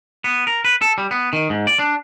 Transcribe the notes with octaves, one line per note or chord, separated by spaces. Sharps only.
B3
A#4
B4
A4
G3
B3
D#3
G#2
D5
D4